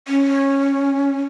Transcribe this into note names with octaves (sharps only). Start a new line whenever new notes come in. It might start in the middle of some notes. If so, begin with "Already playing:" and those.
C#4